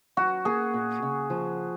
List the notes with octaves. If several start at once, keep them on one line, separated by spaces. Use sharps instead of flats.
F#3 F#4
A#3 G#4
A#2
C#3
F3